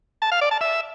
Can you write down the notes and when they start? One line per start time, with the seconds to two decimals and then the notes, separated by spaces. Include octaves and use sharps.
0.22 A5
0.32 F5
0.41 D5
0.51 A5
0.61 E5